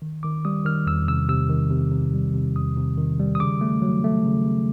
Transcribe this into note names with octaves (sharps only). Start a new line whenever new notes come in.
D#3
D#3 D6
G3 D#6
D#3 F6
E2 E6
C3 E6
C3 E6
D#3
C3
C3
G3
C3
E2 D#6
C3
D#3
G3
D#6
C#3 D6
A3
F#3
A3
C#3
C#3